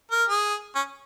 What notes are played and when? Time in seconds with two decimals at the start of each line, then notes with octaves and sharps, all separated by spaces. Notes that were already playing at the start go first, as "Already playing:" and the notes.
0.11 A#4
0.29 G#4
0.75 C#4